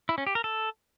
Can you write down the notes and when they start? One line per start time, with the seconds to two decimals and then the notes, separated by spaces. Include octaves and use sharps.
0.09 E4
0.18 C#4
0.27 G4
0.35 A#4
0.44 A4